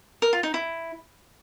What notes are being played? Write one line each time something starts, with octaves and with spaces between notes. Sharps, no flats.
A#4
F4
D#4
E4